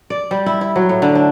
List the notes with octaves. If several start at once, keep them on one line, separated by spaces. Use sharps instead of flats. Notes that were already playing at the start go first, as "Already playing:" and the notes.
D5
G3
E4
E4
F#3
A2
D3
D4